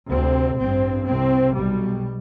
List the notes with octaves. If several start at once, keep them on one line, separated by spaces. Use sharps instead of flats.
D2 C3 C4
A1 G2 C4
C2 C3 C4
B1 B2 G3